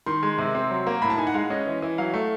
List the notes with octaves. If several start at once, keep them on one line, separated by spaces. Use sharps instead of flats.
D#3 C6
G#3
C3
C4
F#3
A#3
A2 B5
A5
D#4 G#5
F#5
G#3 F5
C#4 D#5
E3
E3
F#3 F5
A3